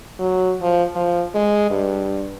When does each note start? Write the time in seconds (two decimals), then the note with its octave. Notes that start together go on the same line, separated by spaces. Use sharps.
0.19 F#3
0.62 F3
0.95 F3
1.34 G#3
1.70 G2